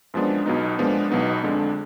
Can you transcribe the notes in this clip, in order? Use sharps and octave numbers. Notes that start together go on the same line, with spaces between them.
F#2 F3 G#3 B3 D4
B1 B2 F#3 B3 D#4
A#2 F3 G#3 B3 D4
B1 B2 F#3 B3 D#4
F2 D3 G#3 D4